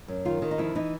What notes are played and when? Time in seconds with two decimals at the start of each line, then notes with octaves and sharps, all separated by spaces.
0.08 F#2
0.25 D#3 F4
0.42 D#3
0.51 D#4
0.58 F2 E4
0.75 E3 D#4